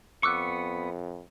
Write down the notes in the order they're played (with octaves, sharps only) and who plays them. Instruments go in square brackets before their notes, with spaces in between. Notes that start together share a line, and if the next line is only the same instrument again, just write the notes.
[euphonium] F2 [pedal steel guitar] B3 C#6 [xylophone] D6 E6 F#6